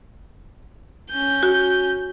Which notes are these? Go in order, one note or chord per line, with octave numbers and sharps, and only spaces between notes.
C#4 G6
F#4